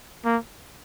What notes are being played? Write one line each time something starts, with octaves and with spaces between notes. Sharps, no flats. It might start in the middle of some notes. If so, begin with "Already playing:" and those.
A#3